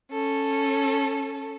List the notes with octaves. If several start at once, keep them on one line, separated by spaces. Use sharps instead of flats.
C#4 A4